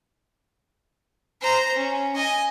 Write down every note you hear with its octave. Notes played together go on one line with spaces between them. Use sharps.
C5 A#5
C#4
D#5 G#5